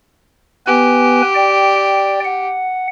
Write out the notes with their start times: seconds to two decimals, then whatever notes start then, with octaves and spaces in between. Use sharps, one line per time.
0.67 B3 G4 B4 G#5
1.35 D5 G5
2.24 F#5